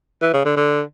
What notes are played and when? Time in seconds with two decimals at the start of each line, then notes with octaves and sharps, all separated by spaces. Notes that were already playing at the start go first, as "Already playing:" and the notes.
0.22 E3
0.33 C#3
0.45 D3
0.57 D3